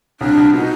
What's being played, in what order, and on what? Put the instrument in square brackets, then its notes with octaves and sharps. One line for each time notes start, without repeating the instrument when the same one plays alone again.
[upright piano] C2 [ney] D4
[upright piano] C2
[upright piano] B2 [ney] D#4